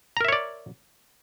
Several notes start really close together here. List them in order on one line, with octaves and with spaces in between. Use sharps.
A#5 A#4 E5 C#5 D5